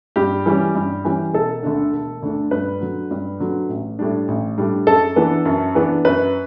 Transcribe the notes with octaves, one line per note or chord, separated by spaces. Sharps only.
G2 G4
E3 G3 C#4
G2
E3 G3 C#4
E1 A4
D2 D3 A3 D4
E1
D2 D3 A3 D4
G2 B4
D3 F#3
G2
D3 F#3
A1
A2 G3 D4
A1
A2 G3 D4
F#2 A4
E3 B3 D4
F#2
E3 B3 D4
F#2 B4